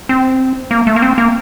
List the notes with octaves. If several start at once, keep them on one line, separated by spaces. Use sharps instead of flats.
C4
A#3
A3
A#3
C4
A#3